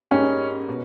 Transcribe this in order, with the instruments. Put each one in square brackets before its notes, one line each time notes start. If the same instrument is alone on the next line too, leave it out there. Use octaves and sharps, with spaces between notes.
[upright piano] G#2 G3 A#3 D#4 G#4 [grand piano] C#4
[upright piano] B2